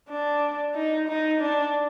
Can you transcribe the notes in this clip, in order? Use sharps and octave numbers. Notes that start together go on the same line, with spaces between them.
D4
D#4
D#4
D4